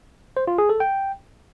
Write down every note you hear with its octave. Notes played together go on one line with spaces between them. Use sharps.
C5
F4
G#4
A4
G5